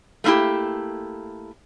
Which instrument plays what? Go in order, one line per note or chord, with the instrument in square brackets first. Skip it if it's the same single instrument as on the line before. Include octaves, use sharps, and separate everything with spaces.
[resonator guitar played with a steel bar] A3 A#3 C#4 E4 G4